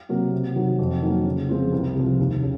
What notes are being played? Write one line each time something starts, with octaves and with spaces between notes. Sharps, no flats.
C3 F#3 A#3
C3
D#3 F#3
F2
D#3 F#3 A#3
C#3
F3 G#3 C4 F4
C2
C3 F3
D#2
C#3